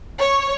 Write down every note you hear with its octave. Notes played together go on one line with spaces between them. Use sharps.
C#5